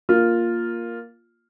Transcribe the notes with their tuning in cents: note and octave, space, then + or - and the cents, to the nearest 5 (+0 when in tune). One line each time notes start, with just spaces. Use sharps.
A#3 +0 F4 +0